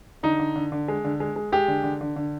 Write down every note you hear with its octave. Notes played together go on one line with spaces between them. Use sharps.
D3 D#4
D3
D3
D3
G#3
D3
G#3
G#3
G#3 G4
D3
D3
D3
D3